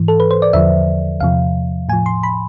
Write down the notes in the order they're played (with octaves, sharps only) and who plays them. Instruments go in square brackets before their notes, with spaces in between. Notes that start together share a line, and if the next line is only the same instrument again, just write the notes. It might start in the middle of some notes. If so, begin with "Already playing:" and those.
Already playing: [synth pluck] G#2 E3
A4
B4
C5
D5
E2 D3 F3 E5
E2 C3 F3 F5
A2 G#5
F3
C6
B5